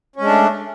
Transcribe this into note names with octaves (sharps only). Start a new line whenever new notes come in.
G#3 A3 C#4 D4